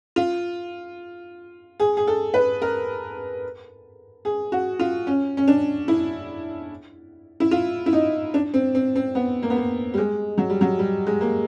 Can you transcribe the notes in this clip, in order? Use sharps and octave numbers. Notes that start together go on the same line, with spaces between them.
F4
G#4
G#4
A4
B4
A#4
G#4
F#4
F4
C#4
C#4
D4
E4
E4
F4
E4
D#4
D4
C4
C4
C4
B3
A#3
B3
A#3
G3
G#3
F#3
G3
F#3
G3
G#3
A#3